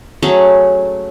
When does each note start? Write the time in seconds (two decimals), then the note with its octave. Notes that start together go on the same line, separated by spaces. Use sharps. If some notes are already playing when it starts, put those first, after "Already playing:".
0.22 F#3 A3 C#4 G#4